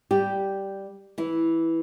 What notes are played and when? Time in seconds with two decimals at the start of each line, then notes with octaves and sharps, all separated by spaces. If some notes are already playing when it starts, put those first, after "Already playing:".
0.11 G3 G4
1.18 E3 E4